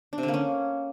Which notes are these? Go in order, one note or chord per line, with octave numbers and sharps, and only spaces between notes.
D4
C3
D3
A#3
C#4